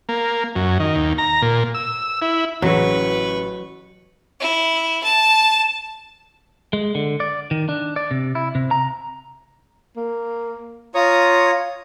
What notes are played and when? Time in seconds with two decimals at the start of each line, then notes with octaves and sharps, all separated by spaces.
0.09 A#3
0.56 F#2
0.80 D#3
0.96 D#2
1.18 A#5
1.42 A#2
1.75 E6
2.22 E4
2.62 A1 C#3 E3 F#3 B4 C#6
4.40 E4
5.04 A5
6.73 G#3
6.95 D3
7.20 D5
7.51 D#3
7.69 D4
7.96 D5
8.11 C3
8.35 E4
8.55 C3
8.71 A#5
9.97 A#3
10.95 F4 C#5 A#5 D#6